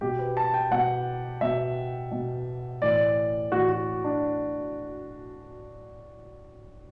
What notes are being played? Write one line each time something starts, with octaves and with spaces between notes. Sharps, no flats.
B2 G4
B4
A5
G5
B2 F#5
B2 E5
B2
A2 E3 D5
A2 E3 F#4
F#4
D4